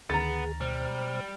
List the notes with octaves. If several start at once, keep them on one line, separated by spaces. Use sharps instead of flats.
D2 D#3 B3 G#4 A#5 A6
B2 G3 C5 F6